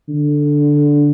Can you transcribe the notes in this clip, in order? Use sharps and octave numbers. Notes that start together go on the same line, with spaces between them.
D3